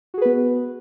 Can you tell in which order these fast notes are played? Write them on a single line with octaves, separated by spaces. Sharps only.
F#4 G#4 B4 B3